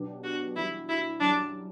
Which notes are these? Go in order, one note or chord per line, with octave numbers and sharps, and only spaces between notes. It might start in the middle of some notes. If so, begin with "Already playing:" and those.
Already playing: B2 F#3 B3 D4 G4
F#4
E3 G3 D4 E4 F#4
E4
F#2 E3 G3 D4